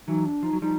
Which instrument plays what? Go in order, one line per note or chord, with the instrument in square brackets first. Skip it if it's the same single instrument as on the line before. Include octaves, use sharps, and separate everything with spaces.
[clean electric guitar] E3 F#3 [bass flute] D#4
[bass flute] D4
[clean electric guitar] F3 [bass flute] D#4
[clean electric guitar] F#3
[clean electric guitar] F3 G3 [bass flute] D#4